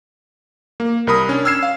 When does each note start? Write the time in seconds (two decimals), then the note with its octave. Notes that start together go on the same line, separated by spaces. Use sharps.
0.80 A#3
1.07 C2 A#4 B5 D#6
1.29 C#4 D4
1.45 E6 F6 G#6 C7 E7
1.63 F5